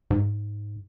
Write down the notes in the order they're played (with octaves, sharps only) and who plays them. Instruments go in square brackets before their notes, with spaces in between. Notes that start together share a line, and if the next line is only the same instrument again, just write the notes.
[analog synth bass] G#2